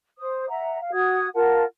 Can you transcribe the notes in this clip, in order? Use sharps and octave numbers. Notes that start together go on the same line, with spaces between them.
C5 D#6
E5 F#5 A#5
F5
F#4 D#6 G#6
F4 A#4 F#5 A5